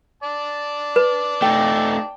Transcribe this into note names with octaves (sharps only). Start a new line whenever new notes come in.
D5 A5
B4
A3 D#4 G5